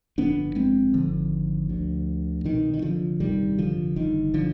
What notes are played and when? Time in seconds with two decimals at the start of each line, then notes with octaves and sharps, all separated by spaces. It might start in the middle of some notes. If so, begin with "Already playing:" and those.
0.18 G1 F2 D3 B3 D4
0.55 G#3 C4
0.94 G#1 G#2 D3 F3
1.69 D2 D3
2.44 C2 B2 D#3
2.74 D#3
2.82 D3 F3
3.20 G1 F2 C3 D#3 G3
3.58 D3 F3
3.96 G1 G2 D3 D#3
4.34 D3 F3